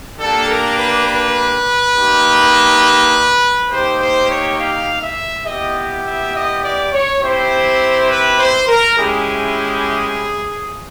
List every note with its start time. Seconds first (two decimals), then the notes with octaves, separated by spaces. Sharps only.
0.19 A#3 D4 G4 A4
0.49 A#4
0.78 B4
1.07 B4
1.94 A#3 D#4 G4
3.71 A#3 D#4 G4 C5
3.99 C5
4.29 C#5
4.58 F5
5.01 E5
5.45 B3 E4 G4 D#5
6.04 E5
6.34 D#5
6.63 D5
6.92 C#5
7.21 C4 E4 G4 C5
8.09 B4
8.38 C5
8.67 A#4
8.97 G#3 C#4 E4 G4 G#4